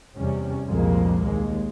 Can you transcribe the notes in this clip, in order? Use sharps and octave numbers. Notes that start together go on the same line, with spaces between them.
E2 C3 G3 C#4
C2 F2 A#2 G#3 A#3
D#2 G#3